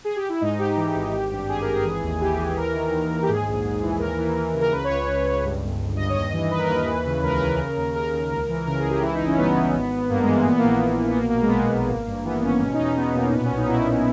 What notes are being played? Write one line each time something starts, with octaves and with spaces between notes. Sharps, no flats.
G#4
G4
E4
G#2 D#4
G#2 G4
E3
G#1
G#1
G2
G2 G#4
A#4
G#1
G#4
E3
D#2
E3 G4
E3
D#2 A#4
D#3
D#2
D#2
G4
G#2 G#4
A#1
G#2
E3
D#2 A#4
E3
E3
C#3
A#4
C#2 B4
C#5
C#2
C#3
C#2
G2
G1
G1
G2 D#5
C#5
D#2 D#5
E3 D#5
E3 B4
A#4
D#2 B4
E3
C#3
C#2 A#4
B4
C#3 A#4
C#3
D#2
D#2 A#4
D#2
C#2
E3
C#3 A#4
G#4
C#2
G4
E3 E4
D#4
G1
C#4
G2 B3
E3
G#1
G#1
G2 A#3
G#3
E3
A#3
A#2 B3
A#3
A#1
A#3
A#2
A#1
B3
B2 A#3
A#3
B2
G#3
B3
B1 A#3
B1
G#1
G2
E3 B3
G#1 C#4
B2 C#4
D#4
E2
C#4
B2 B3
B2 A#3
A#2 B3
C#4
B1
D#4
A#2 E4
B1